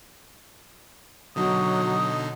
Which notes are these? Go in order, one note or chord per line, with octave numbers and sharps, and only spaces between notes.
B2 D3 F#3 D#4 D#6